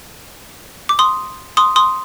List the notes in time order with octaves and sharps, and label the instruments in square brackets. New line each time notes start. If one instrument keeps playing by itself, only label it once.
[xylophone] D6
C6 D#6
C6 D#6
C6 D#6